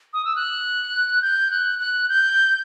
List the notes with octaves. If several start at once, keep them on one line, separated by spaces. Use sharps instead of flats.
D#6
E6
F#6
G6
F#6
F#6
G6